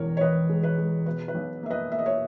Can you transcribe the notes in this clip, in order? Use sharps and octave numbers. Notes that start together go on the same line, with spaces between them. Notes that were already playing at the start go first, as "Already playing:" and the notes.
Already playing: E1 E2 A#4 C#5
C#5
E1 B4 D#5
G#3
B4
G#3
B2 B4
B4
B1
A#3 E5
B4 D#5
A#3 E5
D#5
C#5 E5